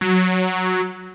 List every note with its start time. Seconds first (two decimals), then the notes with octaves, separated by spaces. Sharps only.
0.01 F#3